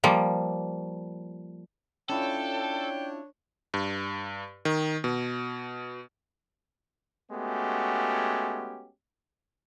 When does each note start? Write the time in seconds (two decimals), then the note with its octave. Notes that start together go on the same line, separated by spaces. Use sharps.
0.04 F3 G3 A#3
2.09 C#4 D4 E4 F4 A4 C#5 G5
3.74 G2
4.65 D#3
5.04 B2
7.32 G#3 A3 B3 C#4 F#4 G4